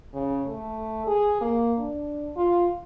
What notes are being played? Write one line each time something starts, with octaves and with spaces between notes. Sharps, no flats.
C#3
A3
G#4
A#3
D4
F4